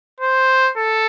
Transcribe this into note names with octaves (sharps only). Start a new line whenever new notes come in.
C5
A4